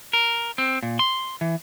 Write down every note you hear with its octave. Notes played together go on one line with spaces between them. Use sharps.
A#4
C4
A#2
C6
E3